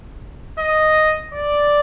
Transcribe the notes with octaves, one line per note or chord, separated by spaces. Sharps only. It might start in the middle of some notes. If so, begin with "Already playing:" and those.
D#5
D5